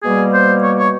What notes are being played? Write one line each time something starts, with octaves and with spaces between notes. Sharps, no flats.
B2 G3 A#3 G#4
C5
C#5
C#5